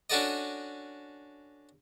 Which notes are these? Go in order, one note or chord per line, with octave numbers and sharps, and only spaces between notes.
C#4 D4 F#4 A4 D5 D#5